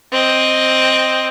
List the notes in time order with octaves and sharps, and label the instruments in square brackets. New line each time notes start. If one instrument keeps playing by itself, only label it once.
[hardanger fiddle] C4 D#5